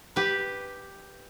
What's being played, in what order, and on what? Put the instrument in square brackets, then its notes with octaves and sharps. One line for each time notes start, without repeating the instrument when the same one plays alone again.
[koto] G4 B4